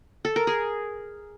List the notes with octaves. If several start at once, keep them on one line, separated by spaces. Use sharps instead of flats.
A4
A#4
G#4